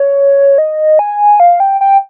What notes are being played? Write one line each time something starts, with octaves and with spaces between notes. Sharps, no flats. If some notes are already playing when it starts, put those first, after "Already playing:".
Already playing: C#5
D#5
G#5
F5
G5
G5